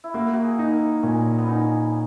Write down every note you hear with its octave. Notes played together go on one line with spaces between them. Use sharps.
E4
A#3 F#4
F#4
G#4
D#4
A#4
A#2 C#4
B3
C#4 D#4